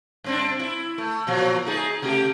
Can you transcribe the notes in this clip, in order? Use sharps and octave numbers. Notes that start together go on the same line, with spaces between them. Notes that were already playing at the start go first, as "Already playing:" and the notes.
G2 C4 D4
E4
A3
A#2 F3 F#3
A3 D#4 G#4
C3 A3 G4